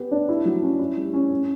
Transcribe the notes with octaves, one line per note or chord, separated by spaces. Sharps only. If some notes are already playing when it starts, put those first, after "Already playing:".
Already playing: B3 G4
D4
E4
F#3
C#4
E4
G3
C#4
C#4